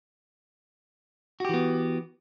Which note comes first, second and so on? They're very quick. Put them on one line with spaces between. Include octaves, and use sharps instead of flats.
F#4 G4 E3 B3